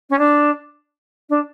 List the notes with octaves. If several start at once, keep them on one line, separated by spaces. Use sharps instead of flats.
C#4
D4
D4